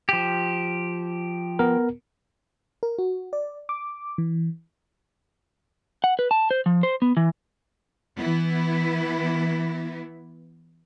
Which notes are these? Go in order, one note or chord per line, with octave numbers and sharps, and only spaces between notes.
F3 G4
B3 A#4
A#4
F#4
D5
D6
E3
F#5
B4
A5
C5
F3
C5
B3
E3
E3 B3 E4